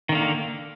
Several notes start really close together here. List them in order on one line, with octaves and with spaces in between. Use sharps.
D#3 D3 A#3